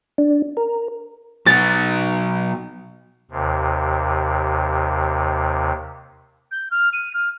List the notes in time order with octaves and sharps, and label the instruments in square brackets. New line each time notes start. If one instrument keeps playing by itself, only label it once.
[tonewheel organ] D4
A#4
[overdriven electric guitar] B2 F#3 [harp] A6
[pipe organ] D#2 C3
[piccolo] G6
F6
D#7
F6